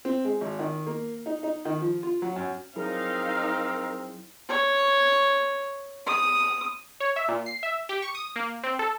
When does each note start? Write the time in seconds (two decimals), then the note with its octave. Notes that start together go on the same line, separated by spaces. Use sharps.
0.05 C4
0.25 G#3
0.41 G#1
0.59 D#3
0.86 A#3
1.26 D#4
1.43 D#4
1.65 D#3
1.81 F3
2.03 F4
2.22 F#3
2.36 F#2
2.76 F#3 C4 D#4 E4 G#4 A#4 F5
4.49 C#5
6.06 D#6
7.00 C#5
7.16 E5
7.28 A#2
7.46 C7
7.63 E5
7.89 G4
8.02 C#6
8.15 D#6
8.36 A#3
8.63 C4
8.79 A4